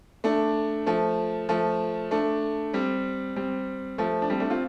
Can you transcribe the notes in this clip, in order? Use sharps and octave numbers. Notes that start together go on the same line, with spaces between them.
A3 D4
F3 A3
F3 A3
A3 D4
G3 C4
G3 C4
F3 A3
D4
G3 C4
A3 D4
C4 F4